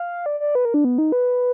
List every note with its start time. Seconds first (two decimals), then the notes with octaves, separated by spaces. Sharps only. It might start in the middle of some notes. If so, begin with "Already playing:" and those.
Already playing: F5
0.26 D5
0.40 D5
0.55 B4
0.65 A#4
0.74 D4
0.84 B3
0.98 D#4
1.12 B4